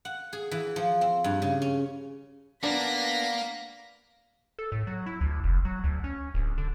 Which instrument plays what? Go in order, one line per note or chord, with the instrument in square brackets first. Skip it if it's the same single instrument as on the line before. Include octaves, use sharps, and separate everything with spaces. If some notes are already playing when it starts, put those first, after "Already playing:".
[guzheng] F#5
G#4
E3
F3
C4
G2
C#3
C#4
[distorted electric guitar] A#3 [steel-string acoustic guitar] B3 [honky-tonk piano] D4 [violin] A#6 B6
[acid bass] A4
A2
F#3
E4
D2
F1
F#3
D2
C#4
D1
D3